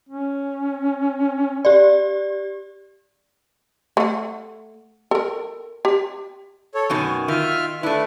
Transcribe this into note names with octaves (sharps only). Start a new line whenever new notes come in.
C#4
G4 D5
A3 F#5
A4 A#4
G4
A4 C#5
F#2 B2 D#3 G#5
D#3 F4 E5 F6
A3 D4 E4 B4